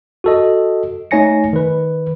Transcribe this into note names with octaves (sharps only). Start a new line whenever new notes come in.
F#4 A4 D#5
A3 D#4 C#5 G#5 A#6 C#7
D#3 B4